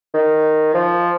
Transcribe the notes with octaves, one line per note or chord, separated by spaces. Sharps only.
D#3
F3